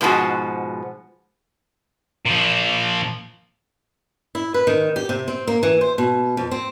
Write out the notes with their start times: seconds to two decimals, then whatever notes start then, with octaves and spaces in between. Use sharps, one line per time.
0.01 G#2 B2 F3 G#3 F#4
2.25 A#2 F3
4.35 E4
4.54 B4
4.67 D#3
4.96 G4
5.09 C3
5.28 C4
5.47 A#3
5.63 E3
5.81 C5
5.98 B2
6.37 F2
6.51 C4